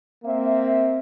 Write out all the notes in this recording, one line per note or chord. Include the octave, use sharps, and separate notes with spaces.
A#3 C4 E5